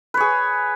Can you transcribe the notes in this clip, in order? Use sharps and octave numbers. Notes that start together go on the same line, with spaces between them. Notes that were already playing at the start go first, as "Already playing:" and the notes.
G#4 B4 C#5